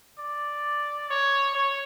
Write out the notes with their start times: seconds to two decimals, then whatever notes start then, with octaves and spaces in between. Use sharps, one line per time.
0.19 D5
1.10 C#5
1.55 C#5